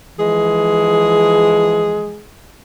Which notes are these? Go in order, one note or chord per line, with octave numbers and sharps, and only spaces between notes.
E3 F3 G#3 G#4